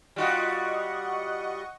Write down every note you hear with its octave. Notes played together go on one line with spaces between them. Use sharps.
G3 F4 F#4 D#5 F#5 C#6